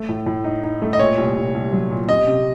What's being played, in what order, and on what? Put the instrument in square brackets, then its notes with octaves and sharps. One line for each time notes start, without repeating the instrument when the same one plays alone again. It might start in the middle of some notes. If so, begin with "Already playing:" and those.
Already playing: [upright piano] A3
A2
A2
D#4
D#4
A3
[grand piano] D#5
[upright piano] A#2 [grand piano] C#5
[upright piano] C2
C2
C2
F#3
A#2
[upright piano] C3 [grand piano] D#5
[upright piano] C3